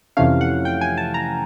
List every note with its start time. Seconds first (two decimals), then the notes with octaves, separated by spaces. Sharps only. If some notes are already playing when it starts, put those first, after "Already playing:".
0.17 F2 C3 E3 A3 C#4 F5
0.41 F#5
0.65 G5
0.81 G#5
0.97 A5
1.14 A#5